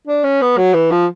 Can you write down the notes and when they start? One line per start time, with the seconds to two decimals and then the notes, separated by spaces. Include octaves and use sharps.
0.07 D4
0.24 C#4
0.41 B3
0.57 F#3
0.74 E3
0.91 F3